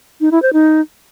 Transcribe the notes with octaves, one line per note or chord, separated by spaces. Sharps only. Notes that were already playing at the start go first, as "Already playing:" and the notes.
D#4
E4
C5
D#4